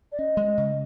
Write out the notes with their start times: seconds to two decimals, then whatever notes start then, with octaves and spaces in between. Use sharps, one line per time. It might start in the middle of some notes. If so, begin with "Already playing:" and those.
0.12 D5
0.19 C#4 D#5
0.37 G#3
0.58 C#3